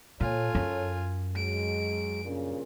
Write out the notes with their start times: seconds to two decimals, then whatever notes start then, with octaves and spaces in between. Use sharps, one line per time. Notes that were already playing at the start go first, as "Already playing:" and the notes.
0.21 A#2 F4 A4 C#5 G#5
0.55 F#2
1.36 F#3 G#3 D7
2.24 G2 A#2 C#3